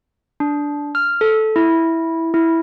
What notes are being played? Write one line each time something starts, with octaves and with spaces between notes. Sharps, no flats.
D4
F6
A4
E4
E4